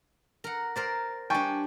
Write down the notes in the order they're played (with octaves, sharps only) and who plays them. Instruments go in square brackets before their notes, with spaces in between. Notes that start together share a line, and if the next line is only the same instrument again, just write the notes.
[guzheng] A#4 F#5
A#4 C5 D5
[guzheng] G3 D4 [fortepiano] G5 G#5 C#6